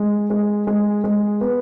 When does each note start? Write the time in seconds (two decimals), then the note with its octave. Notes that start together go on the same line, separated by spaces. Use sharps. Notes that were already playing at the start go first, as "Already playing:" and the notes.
Already playing: G#3
0.30 G#3
0.67 G#3
1.04 G#3
1.41 B3